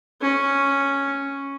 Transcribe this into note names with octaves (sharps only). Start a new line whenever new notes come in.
C#4